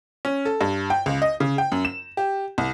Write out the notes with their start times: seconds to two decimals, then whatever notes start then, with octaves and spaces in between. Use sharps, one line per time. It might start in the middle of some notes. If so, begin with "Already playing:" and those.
0.25 C#4
0.45 A4
0.61 G2
0.90 G5
1.06 C#2
1.22 D#5
1.40 C#3
1.58 G5
1.72 F#2
1.85 E7
2.17 G4
2.58 C2